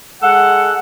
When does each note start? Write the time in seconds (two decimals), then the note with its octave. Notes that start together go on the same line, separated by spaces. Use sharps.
0.22 G#3 A4 F#5